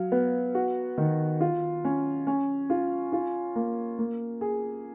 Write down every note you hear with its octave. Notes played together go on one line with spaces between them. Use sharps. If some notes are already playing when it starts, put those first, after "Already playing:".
Already playing: F#3 F5
B3
F#4
D#3
F4
C#4
C#4
F4
F4
A#3
A#3
G#4